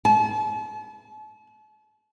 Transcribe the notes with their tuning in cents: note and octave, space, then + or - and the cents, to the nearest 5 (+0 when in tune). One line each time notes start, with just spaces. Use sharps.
A5 -40